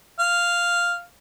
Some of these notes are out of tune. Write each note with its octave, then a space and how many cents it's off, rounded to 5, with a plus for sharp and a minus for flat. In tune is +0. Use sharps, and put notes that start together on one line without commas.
F5 +0